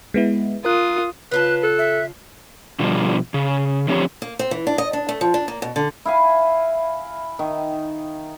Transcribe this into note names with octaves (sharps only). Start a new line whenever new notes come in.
G#3 B3 E4
F4 A#4 D#6 F#6
C#3 F4 B4 A5 F#6
A4 F#6
E5
B2 D3 F3 G3
C#3
D3 F3 C4 G4 C#5
A#3
C4
E3
D4
D#5
D4
A3
F3
D4
A#3
B2
D3
E4 F5 G#5
D#3